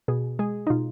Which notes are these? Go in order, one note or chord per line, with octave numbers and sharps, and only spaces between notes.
B2 G#4
G#3 G#4
D#4
B2 F4